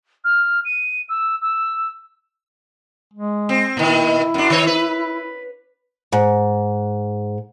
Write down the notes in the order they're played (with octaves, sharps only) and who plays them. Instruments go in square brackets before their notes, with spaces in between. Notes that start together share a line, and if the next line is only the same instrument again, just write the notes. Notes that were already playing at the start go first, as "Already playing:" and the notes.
[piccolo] F6
D#7
E6
E6
[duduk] G#3
[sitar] C4
[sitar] A#2 D#3 [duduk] E4
[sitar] F#2 D4
D#3 C#5
B4
[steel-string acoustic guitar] G#2